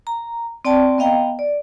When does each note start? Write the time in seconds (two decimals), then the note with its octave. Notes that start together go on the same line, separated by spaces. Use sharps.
0.07 A#5
0.65 C4 D5 G5 A5
0.98 B3 D#5 F5 G5 A#5
1.39 D5